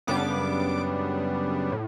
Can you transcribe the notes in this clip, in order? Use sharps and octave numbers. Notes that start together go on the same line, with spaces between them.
F#2 C#3 G3 B3 D4 D6
A2